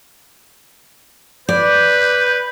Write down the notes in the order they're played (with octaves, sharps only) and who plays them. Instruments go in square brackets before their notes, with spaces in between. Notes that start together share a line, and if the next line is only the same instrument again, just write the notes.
[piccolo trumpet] B4 [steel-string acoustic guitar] D5 [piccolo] G6